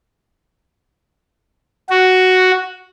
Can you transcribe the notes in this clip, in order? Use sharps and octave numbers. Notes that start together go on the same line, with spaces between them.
F#4